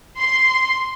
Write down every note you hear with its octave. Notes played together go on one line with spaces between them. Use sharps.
C6